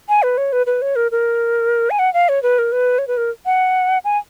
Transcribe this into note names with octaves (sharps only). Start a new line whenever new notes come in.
G#5
B4
C#5
B4
B4
C#5
A#4
A#4
G#5
F#5
F5
C#5
B4
A#4
B4
C#5
B4
A#4
F#5
G#5